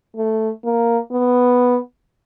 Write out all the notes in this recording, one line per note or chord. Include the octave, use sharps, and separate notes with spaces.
A3
A#3
B3